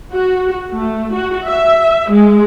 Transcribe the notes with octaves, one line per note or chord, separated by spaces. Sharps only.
F#4
A3
F#4
E5
G#3